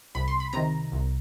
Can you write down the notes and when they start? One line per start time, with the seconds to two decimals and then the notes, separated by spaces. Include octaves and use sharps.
0.15 C2 B5
0.28 C6
0.40 B5
0.53 C3 D#3 A#5
0.92 C2